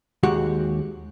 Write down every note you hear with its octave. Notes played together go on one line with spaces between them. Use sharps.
D#2 G#3 F#4 G4 F#5